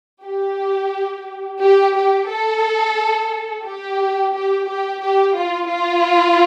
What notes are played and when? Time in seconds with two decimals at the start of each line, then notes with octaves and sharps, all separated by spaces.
0.25 G4
1.61 G4
1.95 G4
2.29 A4
3.64 G4
4.32 G4
4.66 G4
5.01 G4
5.35 F4
5.68 F4